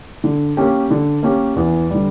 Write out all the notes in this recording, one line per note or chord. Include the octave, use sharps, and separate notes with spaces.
D3
A#3 C#4 G4
D3
A#3 C#4 G4
E2
D3 G3